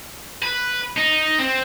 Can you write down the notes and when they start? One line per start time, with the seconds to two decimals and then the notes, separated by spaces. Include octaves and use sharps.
0.42 B4
0.97 D#4
1.39 C4